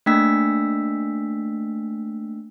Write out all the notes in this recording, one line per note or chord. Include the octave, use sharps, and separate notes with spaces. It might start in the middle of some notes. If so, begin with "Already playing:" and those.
A3 A#3 D4 G5 E6 B6